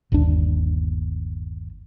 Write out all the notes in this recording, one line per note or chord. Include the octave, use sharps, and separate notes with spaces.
G1 D#2 A#2 D4